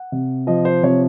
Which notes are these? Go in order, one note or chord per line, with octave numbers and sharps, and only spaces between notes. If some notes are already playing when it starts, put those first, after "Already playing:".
Already playing: F#5
C3
F3 D#5
C5
C3 C#5